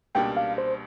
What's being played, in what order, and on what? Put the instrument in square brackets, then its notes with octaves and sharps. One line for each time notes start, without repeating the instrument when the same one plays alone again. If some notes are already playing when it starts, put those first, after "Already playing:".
[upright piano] C#2 B2 G3 A#3 D4 [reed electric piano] G5
[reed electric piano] F5
C5